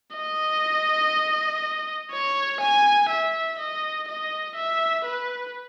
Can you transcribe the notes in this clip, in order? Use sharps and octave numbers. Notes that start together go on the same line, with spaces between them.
D#5
C#5
G#5
E5
D#5
D#5
E5
B4